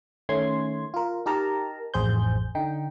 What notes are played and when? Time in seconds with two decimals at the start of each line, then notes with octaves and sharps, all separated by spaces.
0.29 D#3 A3 C#4 C6 G#6
0.94 F4 A#4
1.26 D#4 G4 A#4 A5 A#5
1.94 A1 F2 G#4 C5 G6
2.55 D3 D#4 G5